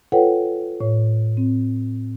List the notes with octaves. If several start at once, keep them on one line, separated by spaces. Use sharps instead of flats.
F4 A4 B4 C#5 F#5 G5
A2 C#5
C4